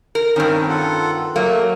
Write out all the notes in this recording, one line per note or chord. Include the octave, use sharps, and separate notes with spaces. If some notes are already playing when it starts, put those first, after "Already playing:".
A#4
G2 D#3 C4 C#4
F4 A4 F#5
F#3 A3 A#3